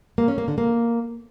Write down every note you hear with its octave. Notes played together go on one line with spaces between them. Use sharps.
A#3
C#4
A#3
D3
A#3